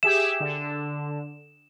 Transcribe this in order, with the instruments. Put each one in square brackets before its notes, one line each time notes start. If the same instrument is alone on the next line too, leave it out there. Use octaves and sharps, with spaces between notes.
[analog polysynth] G4 G#4 E5 [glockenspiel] E7
[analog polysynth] D3